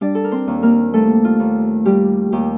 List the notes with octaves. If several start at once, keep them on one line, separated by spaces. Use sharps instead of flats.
G3 D4 D5
A4
A#4
C4 C5
D#2
A#3 A#4
G3 A3 A4
F4
D#2
G3 G4
D#2 G4